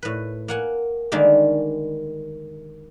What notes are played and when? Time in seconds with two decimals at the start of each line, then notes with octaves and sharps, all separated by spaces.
0.03 A2 B4
0.48 A#3 F#5 G#5
1.12 D3 D#3 G3 G#3 A#3